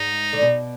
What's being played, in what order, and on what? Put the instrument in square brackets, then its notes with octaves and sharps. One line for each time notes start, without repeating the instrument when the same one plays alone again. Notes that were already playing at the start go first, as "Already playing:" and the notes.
Already playing: [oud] G#2 [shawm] D#4
[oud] D3
B2